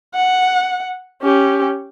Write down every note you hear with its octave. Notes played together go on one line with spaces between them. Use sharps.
F#5
C#4 G4